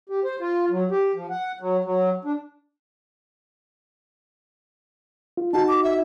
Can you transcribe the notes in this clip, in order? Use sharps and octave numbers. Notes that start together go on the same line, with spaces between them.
G4
C5
F4
F#3
G4
F3
F#5
F#3
F#3
D4
F4
D#4 F#4 A5
D6
E5